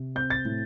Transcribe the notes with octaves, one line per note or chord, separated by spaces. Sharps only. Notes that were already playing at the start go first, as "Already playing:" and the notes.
Already playing: C3
C4 G6
A6
A2